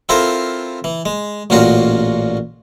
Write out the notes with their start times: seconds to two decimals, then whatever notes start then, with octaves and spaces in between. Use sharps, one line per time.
0.09 C4 E4 F4 A4 A#4 C5
0.84 E3
1.05 G#3
1.50 A1 A#2 C#4 F4 F#4 A#5